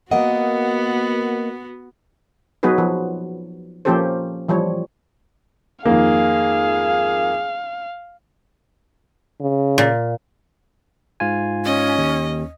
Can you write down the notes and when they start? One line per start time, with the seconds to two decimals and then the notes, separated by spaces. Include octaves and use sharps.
0.11 A#3 B3 F#4 A#4 D#5 F#5
2.63 F#3 B3 D#4 F#4 G#4 B4
2.78 F3
3.85 F3 A#3 C#4 G4 A4 C5
4.49 E3 F3 G3 C#5
5.86 F2 G#2 D#3 A#3 G#4 F5
9.40 C#3
9.78 A#2
11.20 G#2 F4 G#5
11.65 C#4 D#5
11.98 D#2